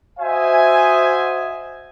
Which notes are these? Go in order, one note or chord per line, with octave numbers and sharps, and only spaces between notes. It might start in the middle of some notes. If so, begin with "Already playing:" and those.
F#4 C5 D#5 E5 G#5